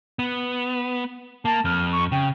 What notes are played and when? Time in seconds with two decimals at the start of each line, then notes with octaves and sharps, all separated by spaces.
0.19 B3
1.45 A#3 A5
1.65 F2 F6
1.92 C#6
2.12 C#3 G5